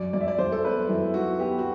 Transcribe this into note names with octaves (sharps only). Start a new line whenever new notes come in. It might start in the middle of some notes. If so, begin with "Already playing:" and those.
Already playing: F#2 D5
F#2 D5
E5
D5
F#2 C5
A4
B3 B4
F#2 E4
F#3 F#4
B3 G4
F#4